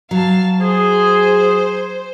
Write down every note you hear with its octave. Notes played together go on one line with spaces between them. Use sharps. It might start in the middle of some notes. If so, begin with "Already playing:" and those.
F#3 F5 A5
G#4 C5